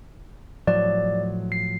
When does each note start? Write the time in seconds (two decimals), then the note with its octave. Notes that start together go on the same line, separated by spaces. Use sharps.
0.67 A2 F3 F#3 D5
1.52 C7